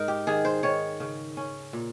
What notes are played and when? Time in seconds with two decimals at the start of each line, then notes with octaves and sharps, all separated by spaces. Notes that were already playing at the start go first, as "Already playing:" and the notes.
Already playing: G#2 D#4 A#4
0.08 G4
0.27 D#3 G#4
0.45 C5
0.63 D#3 C#5
1.00 C#3
1.37 C#4
1.73 A#2